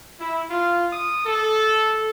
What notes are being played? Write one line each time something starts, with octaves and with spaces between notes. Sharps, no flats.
E4
F4
D#6
A4